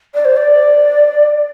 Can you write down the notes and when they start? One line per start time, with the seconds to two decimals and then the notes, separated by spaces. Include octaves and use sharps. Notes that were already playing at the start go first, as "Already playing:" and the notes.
0.15 D5
0.25 C5
0.36 D5